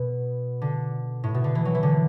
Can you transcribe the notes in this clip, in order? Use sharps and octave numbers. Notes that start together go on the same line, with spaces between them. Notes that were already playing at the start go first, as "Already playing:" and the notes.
Already playing: B2
D3
A2
B2
D3
E3
F#3
E3
D3